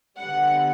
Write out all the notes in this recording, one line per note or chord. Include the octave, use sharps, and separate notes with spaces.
D3 G3 B3 F#5